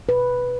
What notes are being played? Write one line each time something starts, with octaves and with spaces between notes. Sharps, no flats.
B2 B4